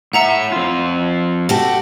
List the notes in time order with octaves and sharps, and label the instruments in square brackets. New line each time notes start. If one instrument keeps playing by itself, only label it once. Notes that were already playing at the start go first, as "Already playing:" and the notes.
[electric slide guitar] A2 E5 [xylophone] F#5 A#5 C#7
[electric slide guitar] F2 F4
[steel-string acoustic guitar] A3 F#4 G4